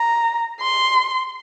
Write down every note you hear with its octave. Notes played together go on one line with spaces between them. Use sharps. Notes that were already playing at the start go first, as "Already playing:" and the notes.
Already playing: A#5
C6